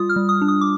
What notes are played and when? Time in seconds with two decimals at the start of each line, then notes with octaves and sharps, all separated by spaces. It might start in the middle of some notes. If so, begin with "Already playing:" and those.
Already playing: G3 F4 D#6
0.09 F6
0.16 G3
0.29 D#6
0.42 D4
0.48 D#6
0.61 D6